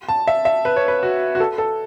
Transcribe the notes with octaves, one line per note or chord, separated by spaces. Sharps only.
A5
E5
E5
B4
C#5
B4
F#4
F#4
A4
A4